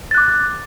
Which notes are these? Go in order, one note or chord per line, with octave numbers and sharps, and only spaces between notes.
D6 F#6 A6